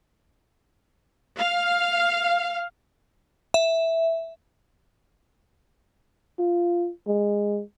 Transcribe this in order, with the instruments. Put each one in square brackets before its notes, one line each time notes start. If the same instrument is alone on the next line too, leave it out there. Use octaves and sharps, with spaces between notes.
[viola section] F5
[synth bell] E5
[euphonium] F4
G#3